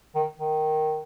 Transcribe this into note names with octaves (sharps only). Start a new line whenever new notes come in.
D#3
D#3